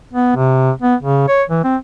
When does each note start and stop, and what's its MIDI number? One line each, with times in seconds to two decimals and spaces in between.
0.13 0.34 59
0.36 0.71 48
0.82 0.95 59
1.03 1.27 49
1.28 1.43 73
1.50 1.62 52
1.64 1.77 60